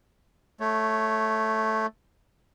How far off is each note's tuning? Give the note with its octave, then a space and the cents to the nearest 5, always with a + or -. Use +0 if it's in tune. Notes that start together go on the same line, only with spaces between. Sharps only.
A3 +0 C#5 +0